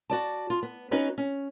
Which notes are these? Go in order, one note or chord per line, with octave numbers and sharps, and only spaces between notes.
F#4 D5 A5
F4
B3
B3 C#4 D#4 F#4 B4
C#4